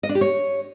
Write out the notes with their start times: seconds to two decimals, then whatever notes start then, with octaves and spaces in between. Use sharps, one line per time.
0.03 D#5
0.09 D4
0.15 G4
0.21 C#5